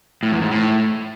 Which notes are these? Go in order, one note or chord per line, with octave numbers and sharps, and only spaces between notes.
A2
E2
G#2
A2